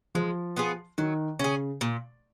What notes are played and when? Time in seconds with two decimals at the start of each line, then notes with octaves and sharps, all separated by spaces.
0.15 F3 G#3
0.56 B3 F4 G#4
0.98 D#3 F#3
1.39 C#3 C#4 G#4
1.81 A#2